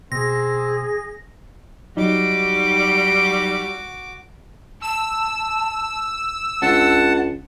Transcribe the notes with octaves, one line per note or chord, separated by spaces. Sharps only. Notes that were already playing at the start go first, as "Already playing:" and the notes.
B2 C4 G#4 A#6
F#3 G3 D#4 F#4 D6
A5 E6
C#2 D4 F#5 A5